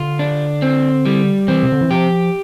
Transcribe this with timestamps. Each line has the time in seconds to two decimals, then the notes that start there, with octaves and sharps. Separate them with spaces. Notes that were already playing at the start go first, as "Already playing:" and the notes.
Already playing: D3 F4
0.19 D4
0.62 C4
1.06 G3
1.48 E3 C4
1.63 C3
1.72 D3
1.81 E3
1.91 F3 G4